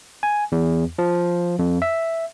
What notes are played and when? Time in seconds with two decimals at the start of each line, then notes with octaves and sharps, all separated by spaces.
0.23 G#5
0.52 E2
0.99 F3
1.59 F2
1.82 E5